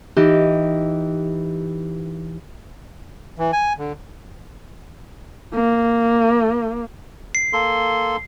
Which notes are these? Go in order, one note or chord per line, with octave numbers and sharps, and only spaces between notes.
E3 D#4 G4
E3
G#5
D3
A#3
C7
A#3 A4 C6